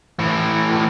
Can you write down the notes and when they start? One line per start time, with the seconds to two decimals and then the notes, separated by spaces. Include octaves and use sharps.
0.19 A2 E3